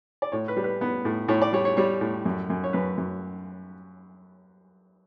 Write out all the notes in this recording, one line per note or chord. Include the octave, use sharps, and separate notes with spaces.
D5
A2 C#5
B4
G3
B4
B3
A2
A2 C#5
D5
G3 C#5
C#5
G3 C#5
A2
F#2
F#2
C#5
F#2 B4
F#2